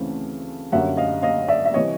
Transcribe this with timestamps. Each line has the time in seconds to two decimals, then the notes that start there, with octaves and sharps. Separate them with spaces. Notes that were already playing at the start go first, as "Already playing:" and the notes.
Already playing: D2 C#3 E3 A3 C4
0.72 F#2 D3 G3 A#3 C#4 E5 F#5
0.97 D#5 F5
1.22 D#5 F5
1.48 D5 E5
1.65 E5
1.74 C3 E3 G3 C#5 D#5